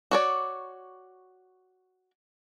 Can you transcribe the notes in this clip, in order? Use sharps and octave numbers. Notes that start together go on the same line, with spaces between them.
F#4 C#5 D5